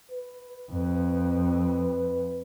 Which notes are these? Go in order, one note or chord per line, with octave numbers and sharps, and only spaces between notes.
B4
F2